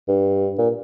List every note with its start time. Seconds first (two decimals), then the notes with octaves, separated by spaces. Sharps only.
0.08 G2
0.58 A#2